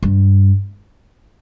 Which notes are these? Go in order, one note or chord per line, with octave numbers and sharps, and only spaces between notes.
G2